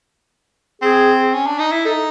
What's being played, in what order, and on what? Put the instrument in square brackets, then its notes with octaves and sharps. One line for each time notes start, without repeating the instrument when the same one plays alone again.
[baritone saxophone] C4 [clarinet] G#4
[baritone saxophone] C#4
D4
D#4
E4
[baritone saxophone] D#4 [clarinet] A4